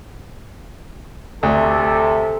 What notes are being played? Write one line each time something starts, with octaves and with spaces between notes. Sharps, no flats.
D2 C3 A4